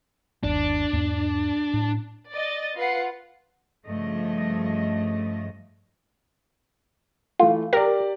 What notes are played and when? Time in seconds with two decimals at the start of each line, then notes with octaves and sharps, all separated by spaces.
0.43 G1 D#2 D4
0.93 E2 G#2 A#3
1.73 A2
2.31 D5 D#5 A6
2.76 F4 B4 F#5 C7
3.86 G2 C#3 F3 A3 D#5
7.40 E3 A3 F4
7.73 G4 A#4 D5